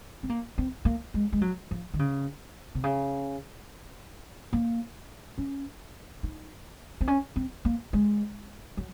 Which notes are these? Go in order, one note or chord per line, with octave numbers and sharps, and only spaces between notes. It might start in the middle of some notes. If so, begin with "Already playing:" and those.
C4
A#3
C4
A#3
G#3
G#3
F#3
F3
D#3
C#3
C3
C#3
A#3
C#4
D#4
C4
C#4
C4
A#3
G#3
F#3